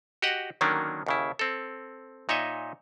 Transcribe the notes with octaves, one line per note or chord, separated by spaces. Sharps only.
F#4 G4 D#5 F#5
D3 D#3 F#3 A#3 C#4 D4
D#2 C#3 E4
C4 A4
A#2 D#4 C#5 D#5 E5